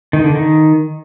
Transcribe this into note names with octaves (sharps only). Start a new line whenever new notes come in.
D#3
D3
D#3